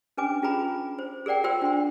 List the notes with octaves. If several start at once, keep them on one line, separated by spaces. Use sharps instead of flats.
C#4 D4 B4 G#5 D6
C#4 F4 G#4 B4 A#5 B5
C5
G#4 A#4 D5 F#5 G5
F4 A#4 C5 G5 C6 E6
D4 C6